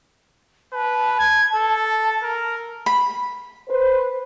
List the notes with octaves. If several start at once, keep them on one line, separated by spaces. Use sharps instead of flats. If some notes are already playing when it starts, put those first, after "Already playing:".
B4 A5
G#6
A4
A#4
B5
B4 C5